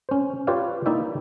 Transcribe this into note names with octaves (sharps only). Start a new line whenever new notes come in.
C#4 C5
F4 G4 B4 C#5 D5 F5
A#3 D#4 E4 D5 E5 G5